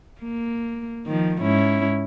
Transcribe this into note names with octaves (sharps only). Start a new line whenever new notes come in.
A#3
D#3 F3
G#2 C#4 E4